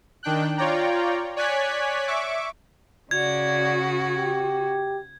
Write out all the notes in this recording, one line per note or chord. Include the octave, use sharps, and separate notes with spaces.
D#3 D4 G5 F#6
F4 C#5 D5 G5 A#5
C#5 D5 G#5 F#6 G#6 B6
E5 C#6 D6
C#3 F#4 D5 G#6
G4